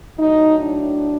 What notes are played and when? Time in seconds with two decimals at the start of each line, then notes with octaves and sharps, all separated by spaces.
0.17 A2 F#3 D#4
0.60 D4